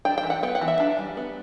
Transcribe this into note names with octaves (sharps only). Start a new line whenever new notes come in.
D4 G5
G5
E3
F#5
B3 G5
F#5
E3
E5
D4
G3
B3